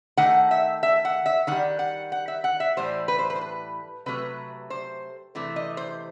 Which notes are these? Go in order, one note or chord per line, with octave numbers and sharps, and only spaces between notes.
D#3 A3 F#5
E5
E5
F#5
E5
D#3 G3 F#5
F#5
F#5
E5
F#5
E5
A2 E3 G3 C5
B4
C5
B4
C5
B4
C3 F#3 A3 B4
C5
C3 E3 A3
D#5
C5